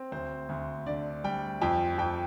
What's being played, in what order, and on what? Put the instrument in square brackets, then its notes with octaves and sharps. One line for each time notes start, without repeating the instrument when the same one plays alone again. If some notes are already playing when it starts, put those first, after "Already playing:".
Already playing: [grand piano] C4
D2 C5
D2
D3 D5
G3 G5
F2 G5
F2 G5